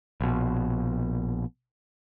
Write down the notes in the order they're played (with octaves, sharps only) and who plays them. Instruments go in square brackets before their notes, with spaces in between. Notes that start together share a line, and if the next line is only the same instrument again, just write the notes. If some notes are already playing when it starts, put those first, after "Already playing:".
[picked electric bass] A#1 B2